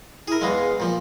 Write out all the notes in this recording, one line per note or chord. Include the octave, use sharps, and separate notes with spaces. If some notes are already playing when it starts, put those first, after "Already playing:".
E4 G#4 A#4
E2 E3 G#3 F5
A#2 F3